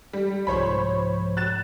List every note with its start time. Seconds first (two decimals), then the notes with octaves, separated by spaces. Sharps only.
0.13 G3
0.47 C2 G#2 F3 C5 C#5 B5
1.37 F#6 A6 E7